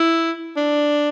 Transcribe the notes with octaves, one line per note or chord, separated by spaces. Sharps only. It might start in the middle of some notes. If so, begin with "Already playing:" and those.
Already playing: E4
D4